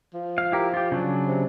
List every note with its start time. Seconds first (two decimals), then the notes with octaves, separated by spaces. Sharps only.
0.14 F3
0.38 F5
0.52 E4 G4 A#4
0.74 F4 G4
0.92 C#3 F#3 D4
1.27 C3